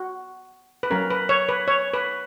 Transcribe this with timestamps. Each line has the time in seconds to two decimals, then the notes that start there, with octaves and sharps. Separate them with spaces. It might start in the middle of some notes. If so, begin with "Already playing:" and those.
Already playing: F#4
0.83 B4
0.90 F#3 C#4 A#4
1.11 B4
1.29 C#5
1.49 B4
1.68 C#5
1.94 B4